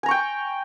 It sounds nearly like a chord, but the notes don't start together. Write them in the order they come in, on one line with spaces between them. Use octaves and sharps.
G#5 A#5 C#6 G5